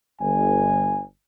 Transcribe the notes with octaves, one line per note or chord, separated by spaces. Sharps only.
G1 G#5